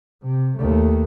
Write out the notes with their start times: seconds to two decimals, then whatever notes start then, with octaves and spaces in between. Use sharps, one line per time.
0.23 C3
0.57 D#2 A3